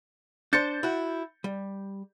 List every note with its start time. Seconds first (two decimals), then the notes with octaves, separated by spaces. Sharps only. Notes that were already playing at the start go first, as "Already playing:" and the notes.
0.53 D4 C5 G6 A6 C#7
0.83 E4 F#4
1.44 G3